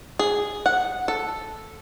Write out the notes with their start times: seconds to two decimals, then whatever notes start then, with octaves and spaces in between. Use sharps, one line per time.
0.19 G#4
0.66 F#5
1.08 A4